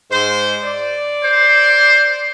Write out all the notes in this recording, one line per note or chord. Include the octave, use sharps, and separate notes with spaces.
G#2 C5
D5
C5